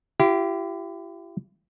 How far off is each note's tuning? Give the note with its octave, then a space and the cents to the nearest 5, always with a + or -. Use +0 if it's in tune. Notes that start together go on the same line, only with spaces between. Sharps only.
E4 +45 G4 -20